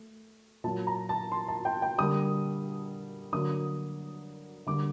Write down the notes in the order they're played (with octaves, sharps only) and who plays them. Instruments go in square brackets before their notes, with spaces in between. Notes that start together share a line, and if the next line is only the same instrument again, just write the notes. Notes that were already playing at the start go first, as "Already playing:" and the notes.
Already playing: [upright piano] A3
A#2 F#3 A#3 A5
A#5
A5
C6
A5
G5
G5
D3 G3 A#3 D#6
D3 F#3 A#3 D#6
D3 G3 A#3 D6